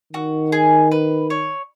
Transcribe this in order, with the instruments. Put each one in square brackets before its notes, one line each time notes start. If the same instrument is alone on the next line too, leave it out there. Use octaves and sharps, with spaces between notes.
[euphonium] D#3 [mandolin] F#4
[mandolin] G#4
B4
C#5